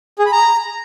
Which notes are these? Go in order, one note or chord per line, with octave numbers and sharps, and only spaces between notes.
G#4
B5
A#5